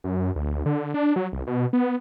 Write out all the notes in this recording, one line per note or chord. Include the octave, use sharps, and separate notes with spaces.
F#2
D2
D3
D4
F#3
C2
B2
B3